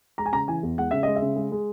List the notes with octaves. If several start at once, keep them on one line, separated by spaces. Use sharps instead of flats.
G#3 A#5
G#5
C#3 A#5
E3 G#5
E2
G#3 F#5
C#3 E5
G#3 D#5
E5
C#3
G#3
G#3